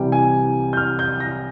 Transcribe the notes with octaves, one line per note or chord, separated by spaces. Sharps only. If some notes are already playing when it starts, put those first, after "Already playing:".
Already playing: C2 C3 E3 G3 G5
G#5
G6
F6
G6
A#6